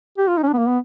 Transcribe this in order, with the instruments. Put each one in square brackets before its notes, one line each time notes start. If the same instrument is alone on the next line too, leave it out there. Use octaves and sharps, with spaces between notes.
[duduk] G4
F4
D#4
C#4
D4
B3
A#3
B3